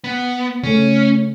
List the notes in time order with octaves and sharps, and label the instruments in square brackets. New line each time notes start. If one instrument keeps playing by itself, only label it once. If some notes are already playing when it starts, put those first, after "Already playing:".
[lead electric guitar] B3
[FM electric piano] C#3 A3 [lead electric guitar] C#4